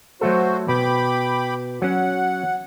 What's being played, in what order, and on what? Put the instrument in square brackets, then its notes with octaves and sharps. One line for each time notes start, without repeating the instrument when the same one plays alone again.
[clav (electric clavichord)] F#3 A3 A4 [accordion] F#4 C5
[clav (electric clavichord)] B2 [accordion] G5 B5 D6
[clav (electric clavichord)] F#3 C#4 [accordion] F#5